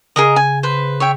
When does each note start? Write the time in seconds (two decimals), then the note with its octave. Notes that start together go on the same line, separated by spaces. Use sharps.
0.16 C#3 G#4 A#4 D#5
0.36 G#5
0.63 B4 C5
1.00 C#5 E5 G5